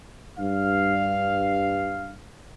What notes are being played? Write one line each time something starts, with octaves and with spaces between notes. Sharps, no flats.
G2 F5